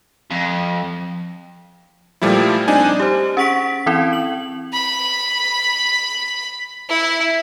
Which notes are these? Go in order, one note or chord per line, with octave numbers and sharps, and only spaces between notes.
F2
A#2 F3 G3 A3 E4
C4 D4 D#4 G#5
G4 C5
C#4 G#4 F#5 C#6 B6 D7
E3 C4 E4
F#7
B5
E4